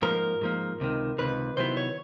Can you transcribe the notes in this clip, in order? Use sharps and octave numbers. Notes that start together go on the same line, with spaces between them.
G#2 F3 A#3 A#4
G#2 F3 A#3
C#2 C3 D#3
C#2 C3 D#3 B4
C3 D#3 F#3 B3 E4 C5
C#5